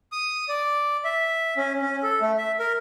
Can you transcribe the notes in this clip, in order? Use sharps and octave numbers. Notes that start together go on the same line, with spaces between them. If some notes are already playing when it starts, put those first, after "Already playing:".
D#6
D5
E5
C#4
C#4
A4
A3
E5
A#4